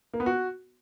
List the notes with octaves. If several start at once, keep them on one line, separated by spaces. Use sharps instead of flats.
A#3
B3
F#4